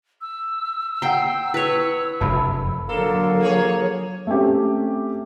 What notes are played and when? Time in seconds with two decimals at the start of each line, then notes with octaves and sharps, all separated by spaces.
0.21 E6
1.02 F#5 G5 A#5 C6
1.54 E4 B4 C#5
2.21 F1 F#2 A5 B5
2.89 D3 F#3 A#3 A4
3.40 F3 G#4 C#5
4.27 A3 C4 C#4 G4